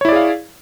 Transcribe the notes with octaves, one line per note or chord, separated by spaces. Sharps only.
E4 G#4 C#5 D5 F5